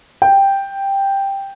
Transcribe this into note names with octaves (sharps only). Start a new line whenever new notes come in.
G5